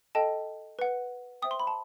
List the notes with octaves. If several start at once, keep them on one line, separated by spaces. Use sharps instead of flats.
A4 D#5 G5 A5
B4 F#5
C5 E5 G5 D#6
C6
B5
A5 C6